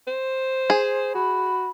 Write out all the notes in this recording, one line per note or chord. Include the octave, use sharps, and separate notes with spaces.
C5
G#4
F#4 B5